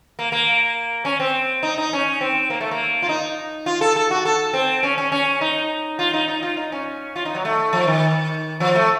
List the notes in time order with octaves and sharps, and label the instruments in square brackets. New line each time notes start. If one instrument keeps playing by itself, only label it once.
[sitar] A#3
A#3
C#4
C4
D#4
D#4
C#4
C4
A#3
A3
A#3
F4
D#4
F4
A4
A4
F#4
A4
C4
C#4
C#4
C#4
D#4
F4
D#4
D#4
F4
D#4
C#4
F4
D#4
F#3
A3
F3
D#3
F3
A3